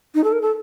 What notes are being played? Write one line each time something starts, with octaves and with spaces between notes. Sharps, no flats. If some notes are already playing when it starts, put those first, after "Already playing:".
D#4
A4
A#4
A4